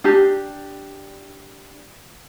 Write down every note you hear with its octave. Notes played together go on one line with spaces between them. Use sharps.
D4 G4